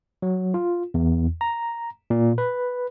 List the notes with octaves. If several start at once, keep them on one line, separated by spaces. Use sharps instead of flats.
F#3
F4
E2
A#5
A#2
B4